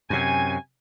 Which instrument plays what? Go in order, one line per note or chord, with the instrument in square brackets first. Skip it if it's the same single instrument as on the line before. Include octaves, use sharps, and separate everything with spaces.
[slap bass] F#2 C3 [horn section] G#5